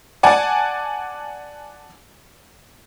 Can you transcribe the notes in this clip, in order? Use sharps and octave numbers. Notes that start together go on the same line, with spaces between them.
D5 F#5 G#5 A5